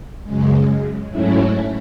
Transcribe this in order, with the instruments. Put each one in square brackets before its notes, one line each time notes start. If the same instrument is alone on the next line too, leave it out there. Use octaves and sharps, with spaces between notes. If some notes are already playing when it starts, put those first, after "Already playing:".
[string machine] F#2 C#3 G#3
G#2 F#3 A3 C#4 E4